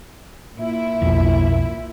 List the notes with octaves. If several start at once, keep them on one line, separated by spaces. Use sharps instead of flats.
A#2 E4
B1 F2